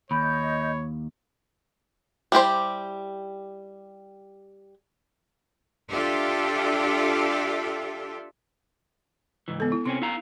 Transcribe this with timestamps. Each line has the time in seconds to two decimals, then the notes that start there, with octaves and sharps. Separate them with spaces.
0.11 D#2 C#5 D#5 B5 G6
2.32 G3 E4 G4 C5
5.90 D4 F4 G4 A4 E5
9.48 C#2 G#2 E3
9.60 B3 A4
9.72 E4
9.85 C3 C4 C#4 C6
10.02 E4 F5 A#5